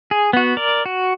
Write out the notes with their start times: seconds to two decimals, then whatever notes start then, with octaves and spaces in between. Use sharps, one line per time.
0.11 G#4
0.33 B3 F#4
0.57 A#4 D5
0.86 F#4